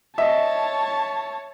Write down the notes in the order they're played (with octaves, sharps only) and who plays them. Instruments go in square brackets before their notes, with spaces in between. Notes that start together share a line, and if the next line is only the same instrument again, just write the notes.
[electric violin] C#5 A5 [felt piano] D#5 E5